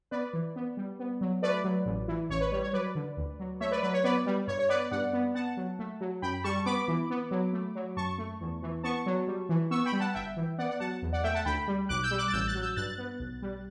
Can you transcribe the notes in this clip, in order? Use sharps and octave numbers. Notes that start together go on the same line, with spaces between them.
B3 B4 D5
E3
B3
G3
B3
F#3
A3 B4 D5
F#3
A1
E3
A1 C#5
B4
G3 C#5
C#5
F#3 B4 D5
D3
D2
F#3
A3 C#5 E5
B4 D5
F#3 B4
C#5
B3 B4 D5
G3
G2 C#5
C#5
B3 B4 D5
G2 D5 F#5
B3
B3 F#5 A5
F#3
A3
F#3
F#2 G5 B5
G3 A5 C#6
B3 B5 D6
E3
B3
F#3
A3
F#3
F#2 A5 C#6
A3
E2
E3
B3 A5 C#6
F#3
G3
E3
B3 C#6 E6
G5 B5
G3
F#5 A5
G1 E5 G5
E3
B3 D5 F#5
D5 F#5
F#3 F#5 A5
E2
D5 F#5
A3 E5 G5
F#5 A5
D2 G5 B5
G3
B1 D6 F#6
E6 G6
G3
D6 F#6
A6
A1 E6 G6
F#6 A6
F#3
E6 G6
G2 F#6 A6
B3
B1
G3